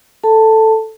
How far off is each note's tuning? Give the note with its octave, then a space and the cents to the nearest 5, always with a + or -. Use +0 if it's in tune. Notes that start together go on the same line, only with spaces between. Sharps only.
A4 +0 A5 +10